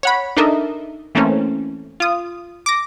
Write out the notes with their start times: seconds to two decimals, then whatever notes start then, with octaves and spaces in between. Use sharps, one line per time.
0.03 C#5 F#5 B5
0.37 D4 D#4 A4 A#4 D#5 E5
1.15 E3 A3 A#3 C4 C#4
2.00 F4 D#6
2.66 D6 A#6